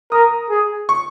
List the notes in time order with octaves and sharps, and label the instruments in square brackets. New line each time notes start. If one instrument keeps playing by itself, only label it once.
[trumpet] A#4 [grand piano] D#6
[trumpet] G#4
[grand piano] C#6